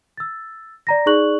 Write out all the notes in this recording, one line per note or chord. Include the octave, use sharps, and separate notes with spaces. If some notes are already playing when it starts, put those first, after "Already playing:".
E6 A6
D5 A#5 A#6
D#4 G#4 D5 C#6 F#6 F#7